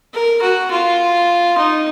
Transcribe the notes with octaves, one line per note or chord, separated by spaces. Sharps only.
A#4
F#4
F4
D#4